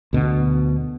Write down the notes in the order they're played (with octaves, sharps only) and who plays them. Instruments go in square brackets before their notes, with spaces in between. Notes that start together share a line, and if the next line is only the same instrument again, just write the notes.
[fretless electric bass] D2 B2 D3